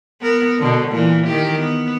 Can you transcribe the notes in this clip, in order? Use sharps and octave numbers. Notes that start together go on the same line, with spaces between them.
B3 A#4
B2 D3
A#2 E3
D#3 G4
B3